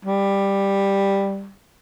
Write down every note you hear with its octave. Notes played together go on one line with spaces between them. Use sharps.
G3